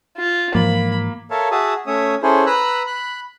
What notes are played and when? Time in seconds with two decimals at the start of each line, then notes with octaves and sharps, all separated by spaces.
0.17 F4
0.55 G#2 E3 F3 A#3 B5
1.31 A4 A#4 C#5 E5 F5 A5
1.51 F#4 G#4 E5 A5 D#6
1.87 A3 C#4 C#5 E5 D#6
2.23 C#4 E4 G#4 A4 C5
2.46 B4 A#5 B5 E6 F#6
2.87 B5 F#6